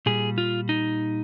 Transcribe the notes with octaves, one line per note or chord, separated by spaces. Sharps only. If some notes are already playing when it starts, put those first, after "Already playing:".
A#2 G3 G#4
F4
D#4